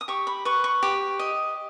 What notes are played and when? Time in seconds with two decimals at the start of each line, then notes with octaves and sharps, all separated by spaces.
0.01 D#6
0.08 G4 C#6
0.27 B5
0.45 B4 C#6
0.64 C#6
0.83 G4
1.19 D#5